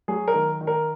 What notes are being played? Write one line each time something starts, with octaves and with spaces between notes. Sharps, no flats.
F#3 G#4
A#4
D#3
D#3
A#4